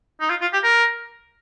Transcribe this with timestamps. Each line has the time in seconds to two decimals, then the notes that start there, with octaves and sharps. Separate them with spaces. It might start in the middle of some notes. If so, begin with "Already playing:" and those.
0.21 D#4
0.30 F4
0.41 F4
0.53 G4
0.63 A#4